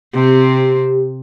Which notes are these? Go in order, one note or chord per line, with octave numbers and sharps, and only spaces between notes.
C3 C4 G4